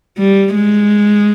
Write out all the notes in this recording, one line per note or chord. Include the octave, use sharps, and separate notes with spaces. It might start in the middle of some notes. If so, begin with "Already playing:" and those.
G3
G#3